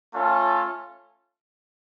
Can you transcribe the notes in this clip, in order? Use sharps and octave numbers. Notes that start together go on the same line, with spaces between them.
A3 C#4 F4 A4